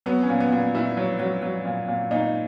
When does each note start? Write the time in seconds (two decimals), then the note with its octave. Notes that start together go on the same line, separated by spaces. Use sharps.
0.06 F#3 B3
0.23 C#4
0.29 A#2
0.40 B3
0.52 A#2
0.74 A#2 E4
0.97 F#3
1.19 F#3
1.42 F#3
1.65 A#2
1.88 A#2
2.11 A#2 D#4